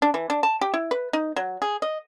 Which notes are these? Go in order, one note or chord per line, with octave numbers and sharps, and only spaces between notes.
D4
E3
D4
A5
G4
E4
B4
D#4
F#3
G#4
D#5